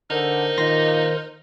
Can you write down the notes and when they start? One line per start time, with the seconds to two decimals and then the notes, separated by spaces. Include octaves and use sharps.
0.10 D3 D#4 A#4 C5
0.58 A#2 D#3 A#3 D#5 C6 A#6